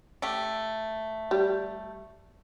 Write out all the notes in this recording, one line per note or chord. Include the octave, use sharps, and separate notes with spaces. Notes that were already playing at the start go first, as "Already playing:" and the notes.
A3 G4
G3